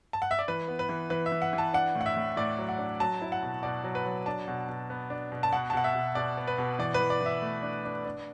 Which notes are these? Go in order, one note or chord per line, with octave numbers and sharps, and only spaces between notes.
A5
F#5
E5
D5
E3 B4
B3
B4
E3
E3 B4
E5
E3
F#5
E3
A5
D4 F#5
A2
F#5
E5
A2
A2 D5
F#3
F#5
D4
F#3 A5
E4
F#5
B2
B2 D5
F#3
B4
F#3
D4 A5
B2
B2
B3
D4
B2
A5
B2 F#5
A5
B2 F#5
E5
B2
B2 D5
B3
B4
B2
E3 D5
B4
E3
D5
E3
E5
A3
D4
D4
D4